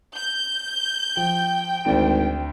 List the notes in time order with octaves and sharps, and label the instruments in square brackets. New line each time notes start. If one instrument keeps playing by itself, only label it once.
[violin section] G6
[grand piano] F3 [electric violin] G5
[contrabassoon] G#1 [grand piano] D2 D5 D7